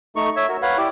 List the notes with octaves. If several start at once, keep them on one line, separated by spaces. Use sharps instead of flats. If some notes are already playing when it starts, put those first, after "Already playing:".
A3 D#4 C#6
C#5 E5
F#4 A#4
B4 C#5 F5 F#5
E4 G4 D5